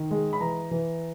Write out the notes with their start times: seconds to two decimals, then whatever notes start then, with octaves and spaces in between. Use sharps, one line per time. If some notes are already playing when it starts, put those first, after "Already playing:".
Already playing: D#3
0.11 G#3
0.33 B5
0.40 E3 A#5
0.71 E3